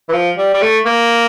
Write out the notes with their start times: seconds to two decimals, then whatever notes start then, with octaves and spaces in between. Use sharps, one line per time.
0.09 E3
0.13 F3
0.38 G3
0.54 G3
0.62 A3
0.85 A#3